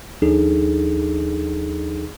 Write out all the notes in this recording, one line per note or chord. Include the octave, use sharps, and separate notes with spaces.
D#2 F3 D4 D#4 G#4 A4